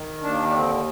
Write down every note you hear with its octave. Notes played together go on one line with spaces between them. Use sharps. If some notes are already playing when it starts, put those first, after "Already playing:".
Already playing: D#3
D#2 D4
D4
D3 C4